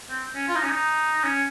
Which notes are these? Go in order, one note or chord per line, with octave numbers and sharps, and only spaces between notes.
C4
C#4
F4
D#4
C#4
D#4
C#4